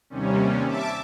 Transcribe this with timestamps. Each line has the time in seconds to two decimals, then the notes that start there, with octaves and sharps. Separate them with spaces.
0.10 D#2 C3 G3 C#4
0.67 E5 A5 D6